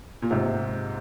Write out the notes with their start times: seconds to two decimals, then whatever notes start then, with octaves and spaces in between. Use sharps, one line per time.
0.22 A#2
0.31 G#2 C3